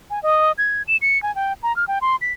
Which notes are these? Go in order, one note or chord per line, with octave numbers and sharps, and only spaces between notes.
G#5
D#5
G#6
E7
C#7
G#5
G5
A#5
F6
G5
C6
B6